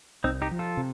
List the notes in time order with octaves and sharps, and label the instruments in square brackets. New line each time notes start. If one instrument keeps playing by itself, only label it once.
[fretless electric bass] C2 [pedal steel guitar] C4 D#4
[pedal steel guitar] D#4 G4
[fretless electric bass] F3
[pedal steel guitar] F4 A4
[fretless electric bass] C3